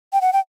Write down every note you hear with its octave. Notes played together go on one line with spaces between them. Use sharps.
G5
F#5
G5